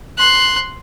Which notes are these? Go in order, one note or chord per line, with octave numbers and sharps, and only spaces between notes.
C6 F#6